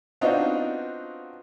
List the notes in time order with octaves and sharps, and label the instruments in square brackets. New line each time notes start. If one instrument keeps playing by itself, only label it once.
[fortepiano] B3 C4 D4 D#4 F4 F#4